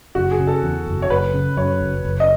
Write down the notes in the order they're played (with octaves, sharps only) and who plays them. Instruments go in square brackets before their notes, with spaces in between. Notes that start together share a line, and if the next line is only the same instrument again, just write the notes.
[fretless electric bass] F#1 [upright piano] F#4
[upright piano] G#4
[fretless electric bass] C#3
[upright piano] A4
[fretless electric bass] E2
F#1
[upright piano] C#5
[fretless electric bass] F#1 [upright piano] B4
[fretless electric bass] C#3
[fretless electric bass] F#2 [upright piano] C#5
[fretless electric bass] F#1
F#1
[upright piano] D#5